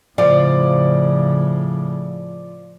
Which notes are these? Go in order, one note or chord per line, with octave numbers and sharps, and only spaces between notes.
A2 C#3 F3 D5